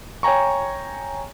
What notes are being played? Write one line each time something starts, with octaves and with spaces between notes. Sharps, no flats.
C#5 G5 G#5 A#5 C#6